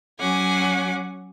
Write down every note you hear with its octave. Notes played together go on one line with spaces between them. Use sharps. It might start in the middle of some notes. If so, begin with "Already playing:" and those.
F#3 C#4 F#5 G#5 D6